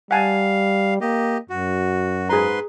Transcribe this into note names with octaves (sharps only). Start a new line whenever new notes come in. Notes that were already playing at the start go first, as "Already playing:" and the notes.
G3 F5 F#5 G#5 A5
A#3 G4 D#5
F#2 F#4
G#2 G#4 B4 A#5 C6